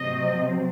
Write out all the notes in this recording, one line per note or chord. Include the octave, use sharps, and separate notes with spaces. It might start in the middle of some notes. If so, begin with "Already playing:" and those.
Already playing: C3 F#3 C4 D#5